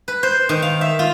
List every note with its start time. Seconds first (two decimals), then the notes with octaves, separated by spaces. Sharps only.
0.08 B4
0.23 C5
0.49 D#3
0.62 F5
0.81 E5
0.99 F4